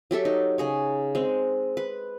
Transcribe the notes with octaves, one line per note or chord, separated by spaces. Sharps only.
F#3 G4 A4 E5
D#4
C#3 G#4 C#5
G#3 C4
B4